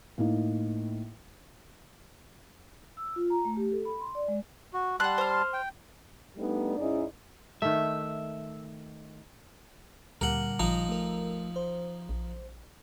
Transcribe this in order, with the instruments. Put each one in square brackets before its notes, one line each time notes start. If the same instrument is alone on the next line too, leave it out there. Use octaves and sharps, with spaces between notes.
[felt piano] A2 A#3 D#4
[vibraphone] E6
F4
A#5
A3
G4
A4
B5
C6
D5
G#3
[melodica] F#4
[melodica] G3 A5 C6 [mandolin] F#5 F#6
[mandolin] C5 F6
[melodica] G5
[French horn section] G3 A3 B3 D4 D#4
G#2 C#4 D#4 E4 G#4 D5
[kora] D#3 A3 [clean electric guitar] E5
[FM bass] D2 [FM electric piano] A#2 D3 G3 [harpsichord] A#4 F#5
[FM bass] A1 [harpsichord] F3 D#4 A#5
[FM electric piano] A3 A#4
C5
[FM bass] A#1